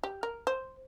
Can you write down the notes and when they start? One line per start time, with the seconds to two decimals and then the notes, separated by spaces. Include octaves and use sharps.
0.03 G4
0.23 A#4
0.47 C5